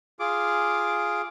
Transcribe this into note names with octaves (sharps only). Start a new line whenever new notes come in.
F4 G#4 D6